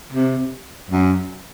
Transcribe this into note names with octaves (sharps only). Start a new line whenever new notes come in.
C3
F#2